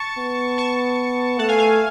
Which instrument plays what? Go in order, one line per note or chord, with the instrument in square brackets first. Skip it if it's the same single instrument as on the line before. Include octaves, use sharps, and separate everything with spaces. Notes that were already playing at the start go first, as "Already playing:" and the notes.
Already playing: [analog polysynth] A5 C#6
[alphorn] B3
[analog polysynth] A5 C#6
[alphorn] A3 [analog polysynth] F#5 A5
[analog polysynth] F5 G#5
F5 G#5